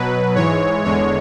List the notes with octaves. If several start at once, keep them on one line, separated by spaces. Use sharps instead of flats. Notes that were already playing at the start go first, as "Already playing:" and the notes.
Already playing: B2 F#3 B4
G#2 E3 G#3 C#5
E2 D3 G#3 C#5